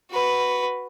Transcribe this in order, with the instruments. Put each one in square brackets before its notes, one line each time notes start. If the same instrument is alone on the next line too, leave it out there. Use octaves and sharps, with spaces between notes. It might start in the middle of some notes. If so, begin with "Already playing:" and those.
[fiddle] F#4 B4